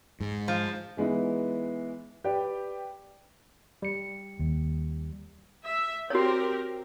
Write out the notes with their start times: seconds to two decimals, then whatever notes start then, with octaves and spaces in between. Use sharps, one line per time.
0.20 G#2
0.48 F3
0.97 E3 G#3 B3 D#4 E4
2.24 G4 B4 D5 G5
3.82 G3 C#7
4.39 D#2
5.65 E5
6.10 C4 F#4 G4 A#4 C#5